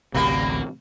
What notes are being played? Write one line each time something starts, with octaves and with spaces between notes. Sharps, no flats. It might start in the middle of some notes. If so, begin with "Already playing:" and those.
A1 D2 C3 F#3 G3 A#3